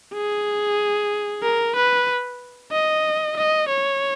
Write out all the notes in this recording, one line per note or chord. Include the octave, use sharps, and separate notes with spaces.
G#4
A#4
B4
D#5
D#5
C#5